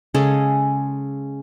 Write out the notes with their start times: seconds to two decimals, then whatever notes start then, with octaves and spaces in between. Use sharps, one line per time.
0.14 C#3 G#3 A4 D#5